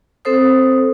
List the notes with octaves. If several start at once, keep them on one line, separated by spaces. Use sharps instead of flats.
C4 A4 C5 D#6